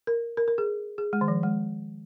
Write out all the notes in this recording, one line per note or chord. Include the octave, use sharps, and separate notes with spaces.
A#4
A#4
A#4
G#4
G#4
G#3
D#3
F3
G#3